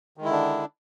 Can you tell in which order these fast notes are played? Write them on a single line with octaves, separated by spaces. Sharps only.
D#3 G#3 E4 D3 D4